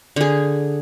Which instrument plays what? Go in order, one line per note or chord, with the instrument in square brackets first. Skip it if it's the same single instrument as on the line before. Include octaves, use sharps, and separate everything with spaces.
[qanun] D3 G#4